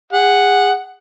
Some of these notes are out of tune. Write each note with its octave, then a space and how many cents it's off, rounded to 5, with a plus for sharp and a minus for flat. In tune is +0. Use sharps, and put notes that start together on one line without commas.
G#4 -30 F#5 +0